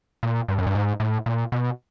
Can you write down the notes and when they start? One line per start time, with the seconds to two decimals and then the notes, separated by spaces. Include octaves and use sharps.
0.23 A#2
0.48 G2
0.58 F#2
0.67 G2
0.75 G#2
1.00 A2
1.26 A#2
1.52 B2